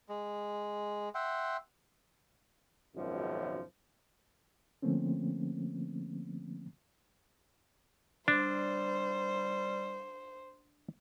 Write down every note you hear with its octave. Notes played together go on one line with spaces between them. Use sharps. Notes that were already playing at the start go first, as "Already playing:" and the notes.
G#3
E5 F#5 G5 C6
G#1 C#2 F#2 B2 D#3 F3
D3 F3 A3 A#3 C4 C#4
G3 D4 C5